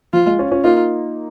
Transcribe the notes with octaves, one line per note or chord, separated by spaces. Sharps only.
F3 F4
G#3
C#4 F4
C#4 F4
A#3 D#4 F4